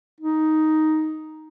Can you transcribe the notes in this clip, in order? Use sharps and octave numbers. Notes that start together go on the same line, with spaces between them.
D#4